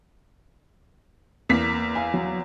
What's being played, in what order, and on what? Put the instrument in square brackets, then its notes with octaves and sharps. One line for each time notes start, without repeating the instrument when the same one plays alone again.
[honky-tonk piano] E2 B6 [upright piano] A#3
[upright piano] F5 G#5
F#3